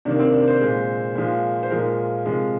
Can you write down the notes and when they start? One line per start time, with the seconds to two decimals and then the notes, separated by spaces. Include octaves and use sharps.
0.05 C3 D#3 A#3 D4
0.19 C4
0.33 D4
0.48 C5
0.61 A#2 G#3
1.15 A#2 F3 G#3
1.63 C5
1.71 A#2 F3 G#3 A#4
2.26 C3 F3 G#3